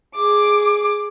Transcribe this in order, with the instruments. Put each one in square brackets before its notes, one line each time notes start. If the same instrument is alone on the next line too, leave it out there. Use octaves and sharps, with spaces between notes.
[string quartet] G#4 D6